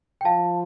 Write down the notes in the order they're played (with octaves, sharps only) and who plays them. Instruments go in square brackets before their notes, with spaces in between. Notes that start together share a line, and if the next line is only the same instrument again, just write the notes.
[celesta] G5
[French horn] F3 [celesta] F5 A5